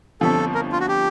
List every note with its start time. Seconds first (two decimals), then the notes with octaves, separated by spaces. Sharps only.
0.21 G1 F2 D3 F3 A4
0.54 A#4
0.72 F4
0.80 F#4
0.88 G4